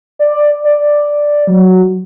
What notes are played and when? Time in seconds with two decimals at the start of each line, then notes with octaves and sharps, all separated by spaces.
0.19 D5
0.64 D5
1.47 F#3